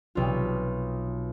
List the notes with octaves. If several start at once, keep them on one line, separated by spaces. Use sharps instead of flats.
B1 F4